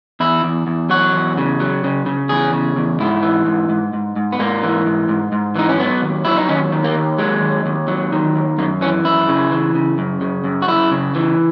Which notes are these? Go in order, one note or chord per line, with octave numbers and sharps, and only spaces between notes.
E2 E4
E2
E2
F#3 F#4
E2
C#3
F#3
C#3
C#3
E2 G#4
C#3
E2
G#2 E4
E3
G#2
G#2
G#2
G#2
B3
G#2 A#3
E3
G#2
G#2
G#2
E3 D#4
C#4
F#3 B3
D#2
F#3 E4
D#4
D#2 C#4
D#3
A#3
D#2
F#3 G#3
D#2
D#2
F#3
D#3
D#2
F#2 A#3
E3 C#4
F#2 E4
C#3
E3
C#3
F#2
C#3
F#2
F#4
F#2 E4
C#3
E3